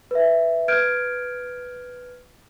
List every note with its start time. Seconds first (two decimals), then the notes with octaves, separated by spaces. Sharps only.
0.11 B4 E5
0.68 B4 F6 G6 G#6 D7